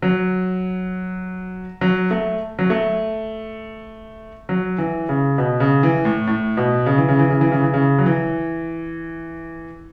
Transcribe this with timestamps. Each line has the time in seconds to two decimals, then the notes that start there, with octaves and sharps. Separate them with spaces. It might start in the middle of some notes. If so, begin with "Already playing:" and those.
0.02 F#3
1.81 F#3
2.11 A3
2.59 F#3
2.70 A3
4.49 F#3
4.78 E3
5.09 C#3
5.38 B2
5.60 C#3
5.83 E3
6.05 A2
6.27 A2
6.57 B2
6.86 C#3
6.98 E3
7.09 C#3
7.19 E3
7.30 C#3
7.41 E3
7.52 C#3
7.63 E3
7.74 C#3
7.98 F#3
8.06 E3